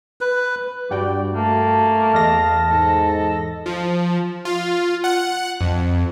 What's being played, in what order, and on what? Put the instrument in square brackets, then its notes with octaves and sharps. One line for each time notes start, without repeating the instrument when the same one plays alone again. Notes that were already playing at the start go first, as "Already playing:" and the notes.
[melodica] B4
[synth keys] G2 F#4 G5 [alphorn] G3 [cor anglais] D5
[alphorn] A3 [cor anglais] A#3 [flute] A5
[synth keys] E2 D#5 A#6 [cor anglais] F5
[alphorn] G#2 [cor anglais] A4
[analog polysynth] F3
F4
F#5
F2